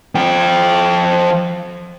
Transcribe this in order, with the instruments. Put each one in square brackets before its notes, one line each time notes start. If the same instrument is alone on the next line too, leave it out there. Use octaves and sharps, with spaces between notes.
[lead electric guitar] F3 G5